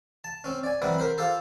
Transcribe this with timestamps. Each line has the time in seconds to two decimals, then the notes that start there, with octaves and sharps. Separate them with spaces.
0.24 A5
0.44 C4 C#4
0.63 D5 G#5
0.82 E3 F#3 G3 C4
0.98 A#4 C5 B5
1.18 F4 G4 A4 C5